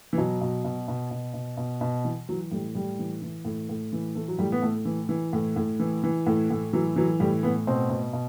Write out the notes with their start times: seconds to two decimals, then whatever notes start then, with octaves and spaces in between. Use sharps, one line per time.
0.13 E3
0.18 B2 F#3
0.41 B2
0.64 B2
0.88 B2
1.11 B2
1.34 B2
1.57 B2
1.81 B2
2.05 E3
2.29 E3 F#3
2.51 A2 G3
2.75 A2 G3
2.99 E3
3.22 E3
3.45 A2
3.69 A2
3.93 E3
4.15 E3 A3
4.28 F#3
4.39 A2 G3
4.52 B3
4.62 A2 A3
4.85 E3
5.09 E3
5.33 A2
5.56 A2
5.80 E3
6.04 E3
6.27 A2
6.50 A2
6.73 E3 F#3
6.96 E3 F#3
7.20 A2 G3
7.43 A2 B3
7.67 B2 C4
7.90 B2
8.13 B2